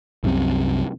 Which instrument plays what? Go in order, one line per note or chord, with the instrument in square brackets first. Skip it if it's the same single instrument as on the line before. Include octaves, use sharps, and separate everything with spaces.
[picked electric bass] C2 F#2 C3